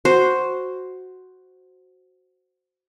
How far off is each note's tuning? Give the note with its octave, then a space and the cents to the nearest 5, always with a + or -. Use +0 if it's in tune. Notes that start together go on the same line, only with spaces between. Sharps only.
F#4 +0 C5 +0